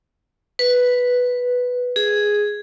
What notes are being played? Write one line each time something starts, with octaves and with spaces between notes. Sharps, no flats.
B4
G#4